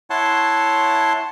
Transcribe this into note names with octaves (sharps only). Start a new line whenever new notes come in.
E4 C#5 F#5 A5 C6